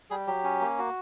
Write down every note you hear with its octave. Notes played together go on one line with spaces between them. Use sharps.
G3 G#4
F#3 G4
C#4
A#3
F#4